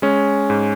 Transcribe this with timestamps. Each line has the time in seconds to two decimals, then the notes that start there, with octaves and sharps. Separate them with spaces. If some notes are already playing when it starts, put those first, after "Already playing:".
0.02 G#3 C#4
0.50 G#2